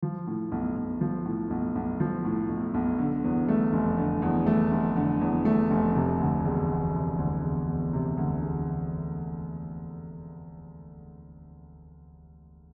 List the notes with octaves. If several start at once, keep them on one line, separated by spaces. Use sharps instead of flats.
F3
A2
B1
B1
F3
A2
B1
B1
F3
A2
B1
B1
D3
E2
A3
F1
D3
E2
A3
F1
D3
E2
A3
F1
C3
D2
E1
E1
C3
D2
E1
E1
C3
D2
E1